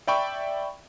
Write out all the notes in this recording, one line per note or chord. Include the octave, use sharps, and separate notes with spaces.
D5 E5 G5 B5 C#6